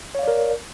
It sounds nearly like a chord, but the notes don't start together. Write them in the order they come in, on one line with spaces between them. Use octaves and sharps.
C#5 F5 D5 A#4